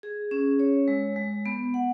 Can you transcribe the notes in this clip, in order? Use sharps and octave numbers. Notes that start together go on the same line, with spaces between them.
G#4
C#4
C#5
G#3
G#3
B3
F#5